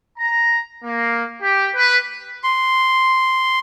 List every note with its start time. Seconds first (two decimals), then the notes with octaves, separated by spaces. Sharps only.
0.19 A#5
0.84 A#3
1.41 G4
1.75 B4
2.44 C6